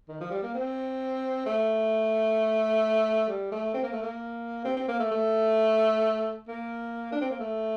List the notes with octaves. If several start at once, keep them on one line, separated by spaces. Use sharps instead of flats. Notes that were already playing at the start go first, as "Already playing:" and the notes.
D#3
F3
G3
A#3
C4
A3
G3
A3
C4
A#3
A3
A#3
C4
C4
A#3
A3
A3
A#3
D4
C4
A#3
A3